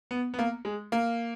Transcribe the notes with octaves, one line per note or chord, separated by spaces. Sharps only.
B3
B3
A#3
G#3
A#3